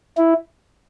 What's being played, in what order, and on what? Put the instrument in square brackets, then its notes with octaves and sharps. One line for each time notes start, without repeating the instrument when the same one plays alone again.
[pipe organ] E4